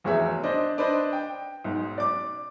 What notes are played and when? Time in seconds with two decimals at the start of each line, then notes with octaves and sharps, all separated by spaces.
0.04 F1 E2 F#4 G#4 C#5 E5
0.43 D4 C5 D#5
0.78 D4 B4 C5 D#5
1.13 G5
1.64 B1 G#2
1.98 D5 D6